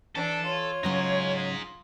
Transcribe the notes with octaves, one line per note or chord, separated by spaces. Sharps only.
E3 D4 A4
F4 C#5
C#3 F#3 C#4 D#4 G#4